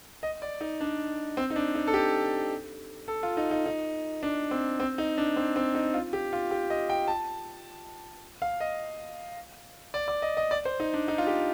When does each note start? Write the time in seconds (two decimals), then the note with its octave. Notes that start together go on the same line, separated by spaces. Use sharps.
0.23 D#5
0.42 D5
0.61 D#4
0.81 D4
1.37 C4
1.50 D#4
1.56 D4
1.75 D#4
1.87 A4
1.94 G4
3.08 A4
3.23 F4
3.37 D#4
3.51 D#4
3.66 D#4
4.23 D4
4.51 C4
4.80 C4
4.98 D#4
5.18 D4
5.36 C4
5.56 C4
5.75 D#4
5.94 F4
6.13 G4
6.33 F4
6.51 G4
6.70 D#5
6.90 G5
7.08 A5
8.42 F5
8.60 D#5
9.94 D5
10.08 D5
10.22 D#5
10.37 D#5
10.51 D5
10.65 C5
10.80 D#4
10.94 D4
11.08 D#4
11.18 F4
11.27 G4